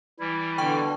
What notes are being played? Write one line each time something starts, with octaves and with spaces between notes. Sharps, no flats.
E3 G3 E4
B2 D3 G5 C#6